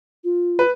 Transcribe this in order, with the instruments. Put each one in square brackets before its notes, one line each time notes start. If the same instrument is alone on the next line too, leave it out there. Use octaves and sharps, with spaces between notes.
[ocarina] F4
[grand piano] B4